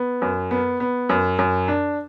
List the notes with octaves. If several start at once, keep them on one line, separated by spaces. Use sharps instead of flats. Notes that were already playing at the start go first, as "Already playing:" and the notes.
Already playing: B3
F#2
B3
B3
F#2
F#2
D4